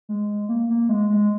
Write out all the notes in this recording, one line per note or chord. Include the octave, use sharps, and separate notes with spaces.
G#3
A#3
A#3
G#3
G#3